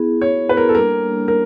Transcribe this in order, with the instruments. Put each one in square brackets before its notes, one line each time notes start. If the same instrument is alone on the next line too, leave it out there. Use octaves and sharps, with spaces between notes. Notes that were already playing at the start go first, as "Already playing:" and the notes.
Already playing: [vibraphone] B3 E4 G#4
[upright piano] C#5
B4
A#4
A4
[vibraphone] G3 A#3 D4 [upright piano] A#4
[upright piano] A#4